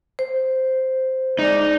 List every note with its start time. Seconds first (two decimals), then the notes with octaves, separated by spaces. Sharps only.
0.19 C5
1.39 G#3 D#4 D5